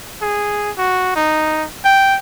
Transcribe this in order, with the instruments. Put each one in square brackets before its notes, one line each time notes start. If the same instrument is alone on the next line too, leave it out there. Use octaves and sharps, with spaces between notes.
[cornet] G#4
F#4
D#4
G5